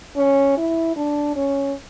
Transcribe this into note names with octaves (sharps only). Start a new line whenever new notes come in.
C#4
E4
D4
C#4